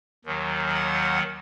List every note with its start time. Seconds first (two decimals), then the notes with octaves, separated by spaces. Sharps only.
0.25 D#2 D#3 F#3
0.74 F#5